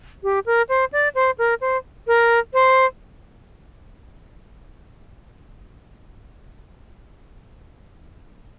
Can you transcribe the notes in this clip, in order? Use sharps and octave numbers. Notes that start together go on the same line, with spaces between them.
G4
A#4
C5
D5
C5
A#4
C5
A#4
C5